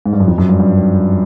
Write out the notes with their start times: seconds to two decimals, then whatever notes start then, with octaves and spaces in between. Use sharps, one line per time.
0.06 G#2
0.13 G2
0.20 F#2
0.28 F2
0.38 F#2
0.49 G2
0.60 G2